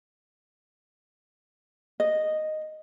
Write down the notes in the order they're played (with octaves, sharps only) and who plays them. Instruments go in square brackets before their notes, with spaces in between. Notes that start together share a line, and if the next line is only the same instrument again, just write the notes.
[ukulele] D#5